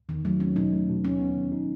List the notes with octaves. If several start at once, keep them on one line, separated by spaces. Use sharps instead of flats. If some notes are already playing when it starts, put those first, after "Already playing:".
E2 D#3
F#3 A3
E2 C#4
B2 D#4
A3
B2
D#2 C#4
B3
D#3
D#4